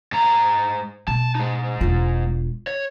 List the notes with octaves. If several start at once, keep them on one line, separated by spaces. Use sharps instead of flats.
G#2 A#5
B2 A5
G#3 D#4
E1 F4
C#5